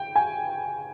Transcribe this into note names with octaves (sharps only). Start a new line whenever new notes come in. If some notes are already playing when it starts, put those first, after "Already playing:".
Already playing: G5
G#5